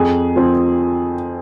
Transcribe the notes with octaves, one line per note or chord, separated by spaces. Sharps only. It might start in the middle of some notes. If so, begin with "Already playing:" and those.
Already playing: F2 G#4
F3 C4